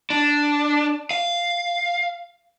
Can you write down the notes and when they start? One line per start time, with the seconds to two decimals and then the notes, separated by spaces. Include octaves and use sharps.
0.10 D4
1.11 F5